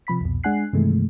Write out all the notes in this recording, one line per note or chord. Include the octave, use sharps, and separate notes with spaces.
C3 F3 B5 B6
C2 F2 B2
G#3 D4 F#5 G#5 F#6 C7
G2 C3 D#3 E3 G#3 A3